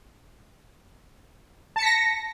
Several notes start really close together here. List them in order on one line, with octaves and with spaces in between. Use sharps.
A5 C#7 B6 A#6